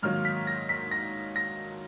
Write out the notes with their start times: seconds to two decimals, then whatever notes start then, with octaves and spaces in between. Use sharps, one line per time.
0.02 G#2 D#3 F#3 A#3 F6
0.25 B6
0.47 A#6
0.69 B6
0.91 A#6
1.36 A#6